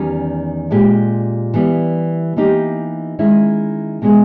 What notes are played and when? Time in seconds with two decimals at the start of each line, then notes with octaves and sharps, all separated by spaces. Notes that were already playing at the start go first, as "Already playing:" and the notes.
Already playing: E2 D#3 G3 C#4
0.71 A#2 G#3 C#4 G4
1.54 E3 G3 B3
2.36 E3 A#3 D#4 G4
3.19 D#3 G#3 C#4 E4
4.02 B2 G#3 B3 D#4 G#4